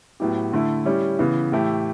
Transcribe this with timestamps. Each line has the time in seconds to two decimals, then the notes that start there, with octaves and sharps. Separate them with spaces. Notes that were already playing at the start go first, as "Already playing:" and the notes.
0.20 A2 F#3 B3 E4 G4
0.53 D3 A3 E4
0.85 G3 C#4 E4 G4
1.19 C#3 E3 B3
1.52 A2 E3 A3 E4 G4